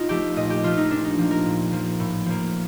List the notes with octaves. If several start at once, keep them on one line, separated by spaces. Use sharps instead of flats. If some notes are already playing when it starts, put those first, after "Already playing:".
Already playing: D#4 F4
F3 A3 G4
A#2 D#5
G4
F3 A3 F4
D#4
A#2 D4
D#4
F3 A#3
A#4
A#2
F3 A#3
A2
F3 A#3